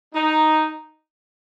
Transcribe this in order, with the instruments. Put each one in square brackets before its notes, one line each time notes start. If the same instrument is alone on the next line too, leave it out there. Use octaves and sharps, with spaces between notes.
[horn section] D#4